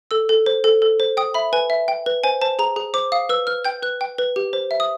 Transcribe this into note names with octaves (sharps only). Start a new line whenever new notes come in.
A4 E6
A4
C5
A4
A4
C5
G5 D#6
E5 B5
B4 G#5
E5
G5
B4
C5 G#5
C5 A5
G#4 A#5
G#4
C5 D6
F5 D#6
B4 E6
B4 F6
G5 G6
B4 F#6
G5
B4
G4
C5
E5
D#6